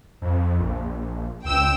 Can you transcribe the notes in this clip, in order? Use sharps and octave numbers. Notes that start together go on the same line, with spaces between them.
F2
A#1
C#2 G5 E6